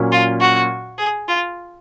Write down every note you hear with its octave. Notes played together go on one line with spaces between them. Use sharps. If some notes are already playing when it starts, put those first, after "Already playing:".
Already playing: A#2 F#3 C#4
F4
F#4
G#4
F4